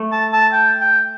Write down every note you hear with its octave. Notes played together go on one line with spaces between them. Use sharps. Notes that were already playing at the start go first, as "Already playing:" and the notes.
Already playing: A3
A5
A5
G5
G5